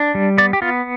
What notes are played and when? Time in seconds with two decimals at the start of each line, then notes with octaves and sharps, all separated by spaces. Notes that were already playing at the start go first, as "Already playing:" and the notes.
Already playing: D4
0.15 G3
0.38 B3 D5
0.53 G4
0.62 B3 F4